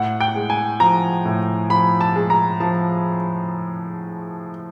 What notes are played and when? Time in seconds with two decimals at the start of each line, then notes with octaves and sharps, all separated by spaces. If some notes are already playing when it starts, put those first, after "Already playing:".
Already playing: A2 F#5
0.20 G5
0.35 G#3
0.50 G#5
0.80 F3 A#5
1.25 A2
1.70 F3 B5
2.01 A5
2.15 G#3
2.30 A#5
2.60 F3 A5